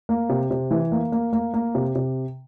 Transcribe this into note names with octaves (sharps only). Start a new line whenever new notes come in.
A#3
C3
C3
E3
A#3
A#3
A#3
A#3
C3
C3